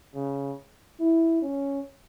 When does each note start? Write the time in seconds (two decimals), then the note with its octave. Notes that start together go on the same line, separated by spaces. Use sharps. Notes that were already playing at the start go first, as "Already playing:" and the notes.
0.15 C#3
1.00 E4
1.42 C#4